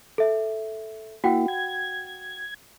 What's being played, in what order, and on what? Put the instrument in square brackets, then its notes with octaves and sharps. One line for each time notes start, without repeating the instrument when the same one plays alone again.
[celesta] A4 E5
[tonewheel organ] A#3 E4 [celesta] F#4 F#5 G5
[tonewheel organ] G#6